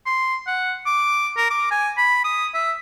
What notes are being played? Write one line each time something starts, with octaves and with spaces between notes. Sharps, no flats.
C6
F#5
D6
A#4
D6
G#5
B5
D#6
E5